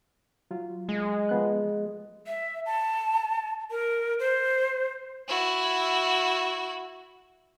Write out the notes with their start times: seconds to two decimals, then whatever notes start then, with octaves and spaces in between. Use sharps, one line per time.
0.51 F#3 F4
0.89 G#3
1.29 F3 B3 F#6
2.27 E5
2.66 A5
3.71 A#4
4.19 C5
5.28 E4 F#4